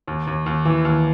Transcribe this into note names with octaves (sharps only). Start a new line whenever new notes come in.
D#2
D#2
D#2
E3
D#2